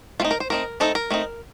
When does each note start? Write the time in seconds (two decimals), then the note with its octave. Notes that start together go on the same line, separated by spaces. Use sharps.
0.20 A3 C4 D#4 F4
0.31 A#4
0.40 C5
0.50 A3 C4 D#4 A#4
0.80 A3 C4 D#4 A4
0.95 A#4
1.10 A3 C4 D#4